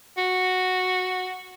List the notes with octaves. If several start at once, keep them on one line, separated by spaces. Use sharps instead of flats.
F#4